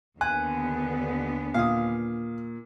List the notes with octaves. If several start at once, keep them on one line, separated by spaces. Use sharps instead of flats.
D#2 D3 B3 G#5 F#6
A#2 F5 D#6